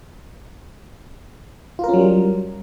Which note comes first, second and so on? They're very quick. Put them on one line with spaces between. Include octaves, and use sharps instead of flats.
F4 A#4 C#4 F#3 G3